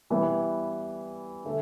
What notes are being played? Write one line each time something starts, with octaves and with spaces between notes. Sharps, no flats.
E3 G3 B3
D3 A3